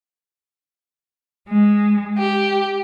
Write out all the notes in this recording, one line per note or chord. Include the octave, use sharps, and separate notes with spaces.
G#3
G4